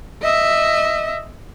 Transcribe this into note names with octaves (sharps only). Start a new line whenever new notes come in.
D#5 E5